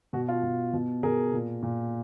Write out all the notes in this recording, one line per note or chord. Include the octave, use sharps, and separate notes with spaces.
B2 F#4
F4
B2
B2
B2 G#4 A#4
A#2
A#2